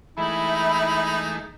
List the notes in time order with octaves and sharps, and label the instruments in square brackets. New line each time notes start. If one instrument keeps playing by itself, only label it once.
[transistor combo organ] E3 G#3 A3 [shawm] D#4 [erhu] E4 [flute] B5